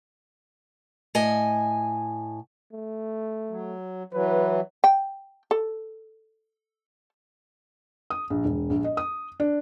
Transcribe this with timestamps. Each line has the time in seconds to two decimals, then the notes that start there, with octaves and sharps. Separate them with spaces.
1.15 A2 D#5 G#5
2.73 A3
3.50 F#3
4.13 E3 F#3 B4
4.84 G5
5.51 A4
8.10 D#6
8.30 A#1
8.45 E1
8.70 A#1
8.84 D#5
8.97 D#6
9.40 D4